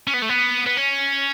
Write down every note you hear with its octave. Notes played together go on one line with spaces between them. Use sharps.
C#4
B3
A3
B3
B3
C#4